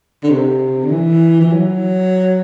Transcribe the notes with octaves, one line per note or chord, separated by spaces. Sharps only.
D3
C3
D3
E3
E3
F#3